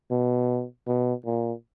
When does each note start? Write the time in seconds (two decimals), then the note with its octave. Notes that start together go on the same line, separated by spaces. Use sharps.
0.11 B2
0.87 B2
1.26 A#2